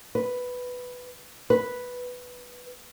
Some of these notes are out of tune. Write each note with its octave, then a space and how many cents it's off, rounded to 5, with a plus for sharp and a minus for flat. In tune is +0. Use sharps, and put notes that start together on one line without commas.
B4 +5
B4 +0